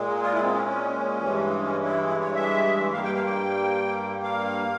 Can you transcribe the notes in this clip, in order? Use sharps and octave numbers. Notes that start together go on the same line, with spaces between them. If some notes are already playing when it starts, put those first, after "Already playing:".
Already playing: A#2 G#3
F4
E4
C4
C#4
C#4
G2 E3 G#3
C#4
E4
E4
C#5
E5
G2 G3 A#3 F5
G5
F5
G5
F5